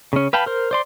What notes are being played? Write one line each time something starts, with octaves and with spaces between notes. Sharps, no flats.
C#3 C#4
B4 F5 G5 A5 B5
A#4 C5
C5 D5 C6